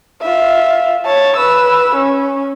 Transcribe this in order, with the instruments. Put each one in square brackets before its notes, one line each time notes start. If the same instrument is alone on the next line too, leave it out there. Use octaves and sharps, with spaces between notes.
[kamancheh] F4 E5
C#5 A5
B4 E6
C#4